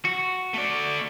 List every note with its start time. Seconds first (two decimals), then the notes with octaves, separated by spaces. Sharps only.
0.05 F#4
0.54 A3 D5